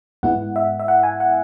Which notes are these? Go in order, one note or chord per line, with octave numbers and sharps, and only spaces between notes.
G#2 G#3 B3 E4 F#5
E5
E5
F#5
G#5
F#5